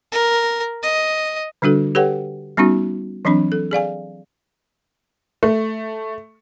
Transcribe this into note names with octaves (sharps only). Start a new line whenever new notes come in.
A#4
D#5
D3 G3 D4 F#4 A4
G4 A4 B4 C#5 F#5 G5
G3 B3 C#4 D#4 F#4
E3 F#3 C4 D4 B5
A4
G#4 D5 F5 G#5
A3